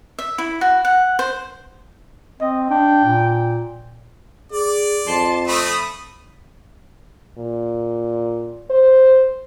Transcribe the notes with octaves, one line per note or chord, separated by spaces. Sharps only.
E5
E4
F#4
F#5
C5
C4 D#5
D4 G5
A#2
G#4 D5
F2 A5 C6
A3 C4 B5 D#6
A#2
C5